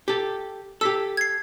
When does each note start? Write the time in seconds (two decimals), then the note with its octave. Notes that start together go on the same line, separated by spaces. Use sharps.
0.08 G4 A4
0.81 G4 A4 E6 B6
1.17 G#6 C7